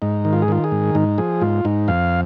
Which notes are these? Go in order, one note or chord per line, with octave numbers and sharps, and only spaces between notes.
G#2 D#4
D#3
F4
G#4
D#3 F4
G#4
G#2
G#2 D#4
F3 G#4
G#2 F4
G#2 D#4
F2 F5